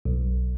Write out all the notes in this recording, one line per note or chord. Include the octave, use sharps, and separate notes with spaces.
B1